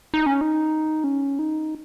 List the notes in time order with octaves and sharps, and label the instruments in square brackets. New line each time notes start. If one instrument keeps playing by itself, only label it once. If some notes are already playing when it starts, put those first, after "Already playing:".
[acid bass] D#4
C#4
D#4
C#4
D#4